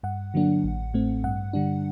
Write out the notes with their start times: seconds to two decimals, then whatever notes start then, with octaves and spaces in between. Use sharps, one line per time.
0.03 G2 F#5
0.34 D3 F#3 A#3 D4
0.64 A1
0.94 A2 A3 C4
1.24 G2 F#5
1.53 D3 G3 D4